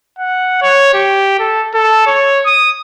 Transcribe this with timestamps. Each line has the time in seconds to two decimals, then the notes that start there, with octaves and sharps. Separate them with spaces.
0.19 F#5
0.62 C#5
0.94 G4
1.39 A4
1.74 A4
2.06 C#5
2.45 D#6